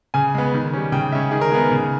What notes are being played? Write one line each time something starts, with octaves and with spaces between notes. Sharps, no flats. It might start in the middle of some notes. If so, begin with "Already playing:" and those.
C#3 G#5
G#3 B3
D#3
G3 C#4
C#3 G5
G#3 C#4 E5
D#3 G#4
A#4
G#3 B3 G#4
C#3